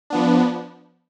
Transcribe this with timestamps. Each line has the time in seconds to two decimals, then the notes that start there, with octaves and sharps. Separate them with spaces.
0.10 F3 B3 D4